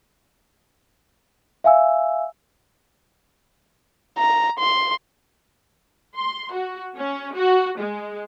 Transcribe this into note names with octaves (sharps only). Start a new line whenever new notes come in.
E5 F5 G#5 E6
A#5
C6
C6
F#4
C#4
F#4
G#3